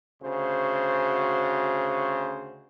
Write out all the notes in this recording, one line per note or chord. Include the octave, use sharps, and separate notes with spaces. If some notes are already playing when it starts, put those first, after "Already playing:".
D2 C#3 F#4 C5